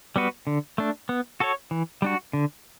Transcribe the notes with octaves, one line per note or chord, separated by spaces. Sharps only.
G3 B3 F#4 B4
D3
A3 D4
B3
F#4 A4 C#5
E3
G3 D4 F#4
D3